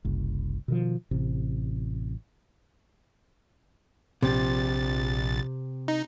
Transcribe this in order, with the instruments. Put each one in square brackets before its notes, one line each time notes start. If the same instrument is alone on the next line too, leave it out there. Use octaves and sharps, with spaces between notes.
[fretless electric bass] F#1 C2
B2 D#3 F3
A1 C3
[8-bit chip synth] A#1 A6 [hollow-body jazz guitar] C3
[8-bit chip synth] D#4